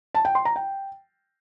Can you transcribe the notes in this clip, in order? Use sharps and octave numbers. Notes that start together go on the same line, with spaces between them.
A5
G5
C6
A#5
G5